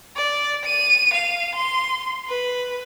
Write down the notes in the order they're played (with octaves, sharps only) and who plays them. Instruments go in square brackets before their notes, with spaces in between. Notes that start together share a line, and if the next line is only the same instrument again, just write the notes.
[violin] D5
D#7
F5
C6
B4